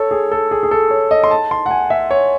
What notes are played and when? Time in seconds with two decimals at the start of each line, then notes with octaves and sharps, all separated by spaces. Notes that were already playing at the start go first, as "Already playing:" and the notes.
Already playing: A4 C#5
0.11 G#4
0.32 A4
0.51 G#4
0.63 G#4
0.71 A4
0.91 C#5
1.11 D#5
1.24 C6
1.31 A5
1.51 C6
1.66 F#5
1.71 G#5
1.90 E5
2.11 C#5